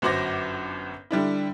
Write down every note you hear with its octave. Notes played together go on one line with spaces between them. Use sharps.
G1 F#2 F#4 C5 D6 A#6
D3 G3 D4 E4